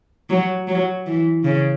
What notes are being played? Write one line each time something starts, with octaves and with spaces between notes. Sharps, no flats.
F#3
F#3
E3
C#3